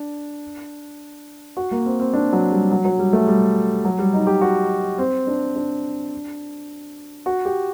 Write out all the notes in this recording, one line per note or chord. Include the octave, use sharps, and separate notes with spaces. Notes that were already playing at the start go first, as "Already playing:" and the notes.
Already playing: D4
F#4
A#3
C4
C4
D4
F#3
G3
F#3
F#3
G3
A3
G3
F#3
G3
D#4
G4
F#4
C4
D4
D4
F#4
G4